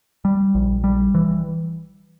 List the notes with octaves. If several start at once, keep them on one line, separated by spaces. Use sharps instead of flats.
G3
A#1
G3
E3